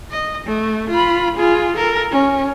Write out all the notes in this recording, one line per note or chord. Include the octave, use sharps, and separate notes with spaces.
D#5
A3
F4 B5
F4 G#4
A4 A#4
C#4